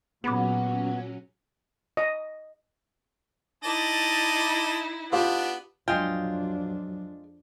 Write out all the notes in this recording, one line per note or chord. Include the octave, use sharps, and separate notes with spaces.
A#2 F#3 B3 C#4 G#4 B5 D6
D#5
D#4 E4 D5 D#5 A5
B3 D4 F4 G4
F2 F#3 G#3 D4 F4 G5